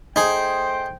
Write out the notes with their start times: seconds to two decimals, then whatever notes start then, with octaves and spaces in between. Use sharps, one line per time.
0.16 A3 D#4 G#4 C5 G5